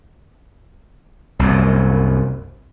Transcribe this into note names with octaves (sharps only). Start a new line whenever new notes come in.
C2 F#2 A#2